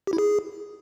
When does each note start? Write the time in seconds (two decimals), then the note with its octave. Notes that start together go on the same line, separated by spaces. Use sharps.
0.07 G4
0.13 E4
0.18 G#4